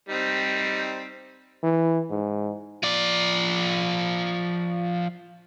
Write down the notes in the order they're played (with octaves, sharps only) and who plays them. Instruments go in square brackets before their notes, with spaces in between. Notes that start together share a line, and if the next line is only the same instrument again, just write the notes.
[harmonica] G3 C4 D#4
[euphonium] E3
G#2
[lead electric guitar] F3 D5